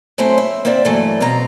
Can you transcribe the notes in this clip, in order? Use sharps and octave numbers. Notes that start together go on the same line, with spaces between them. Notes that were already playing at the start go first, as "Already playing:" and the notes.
F#3 A3 C4 C#4 E4 C5
E5
A#3 C4 C5 D5 E5
G2 E3 F#3 A3
B2 C4 B4 F5 A#5